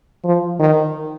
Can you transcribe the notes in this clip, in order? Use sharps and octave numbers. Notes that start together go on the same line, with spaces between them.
F3
D#3